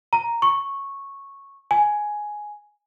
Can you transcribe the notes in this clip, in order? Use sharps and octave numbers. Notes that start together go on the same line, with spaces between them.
A#5
C#6
G#5